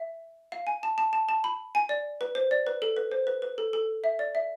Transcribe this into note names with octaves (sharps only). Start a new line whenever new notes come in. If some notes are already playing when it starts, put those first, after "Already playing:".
Already playing: E5
F5
G#5
A5
A5
A5
A5
B5
G#5
D5
B4
C5
D5
B4
A4
B4
C5
B4
B4
A4
A4
E5
D5
E5